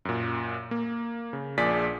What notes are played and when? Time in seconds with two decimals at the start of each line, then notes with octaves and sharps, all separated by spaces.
0.05 F#2 A#2
0.71 A#3
1.33 C#3
1.57 A#1 A#2 G#4 D5 B6